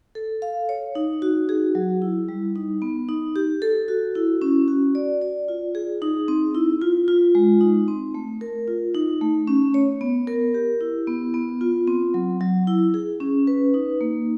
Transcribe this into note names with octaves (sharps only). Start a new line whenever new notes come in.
A4
F5
C#5
D#4
F#4
G#4
F#3
E4
G3
D#4
B3
D#4
G4
A4
F#4
E4
C#4
F#4
D5
D5
F4
G#4
D#4
C4
E4
F4
F4
G#3
D#4
C4
A3
A#4
F4
D#4
A3
C#4
C#5
B3
A#4
G4
E4
B3
B3
F4
C4
F#3
F#3
E4
G#4
C#4
B4
D#4
A#3